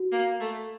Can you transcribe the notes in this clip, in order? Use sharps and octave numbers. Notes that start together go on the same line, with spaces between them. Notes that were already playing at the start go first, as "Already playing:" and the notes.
Already playing: F#4
A#3
A3